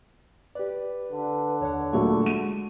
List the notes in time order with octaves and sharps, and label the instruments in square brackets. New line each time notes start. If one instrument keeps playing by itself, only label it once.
[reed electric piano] G4 D5 [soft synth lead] B4
[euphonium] D3
[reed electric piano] D#2 A4 F#5 [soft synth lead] C#5
[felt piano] A#2 F#3 A3 [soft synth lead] C#6
[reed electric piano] G#3 [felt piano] D#7